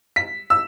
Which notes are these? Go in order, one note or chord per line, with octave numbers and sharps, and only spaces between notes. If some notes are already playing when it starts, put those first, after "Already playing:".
B6
E6